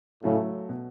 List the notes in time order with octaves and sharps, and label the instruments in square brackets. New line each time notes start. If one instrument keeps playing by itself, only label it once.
[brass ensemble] A2 C#3 [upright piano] F#3 A3
[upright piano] B2